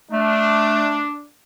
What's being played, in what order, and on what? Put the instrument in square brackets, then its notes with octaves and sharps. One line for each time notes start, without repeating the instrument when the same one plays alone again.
[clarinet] A3 [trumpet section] D4